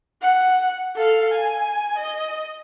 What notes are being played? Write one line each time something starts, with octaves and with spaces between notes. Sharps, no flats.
F#5
A4 F5
G#5
D#5